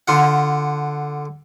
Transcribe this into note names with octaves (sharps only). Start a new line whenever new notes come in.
D3 F4 F#5